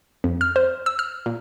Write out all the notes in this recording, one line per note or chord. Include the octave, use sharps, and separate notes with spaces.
F2
F6
C5
E6
F6
A#2